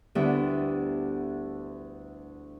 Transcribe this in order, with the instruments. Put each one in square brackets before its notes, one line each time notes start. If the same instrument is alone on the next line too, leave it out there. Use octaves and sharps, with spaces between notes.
[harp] D2 D3 G3 B3 E4